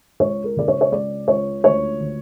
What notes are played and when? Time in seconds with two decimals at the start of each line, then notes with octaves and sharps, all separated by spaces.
0.20 C#2 C#5
0.44 A#4
0.56 C#3 D5
0.68 C#5
0.81 C#5
0.91 C#2 D5
1.28 C#2 C#5
1.64 D2 C#5
2.00 D3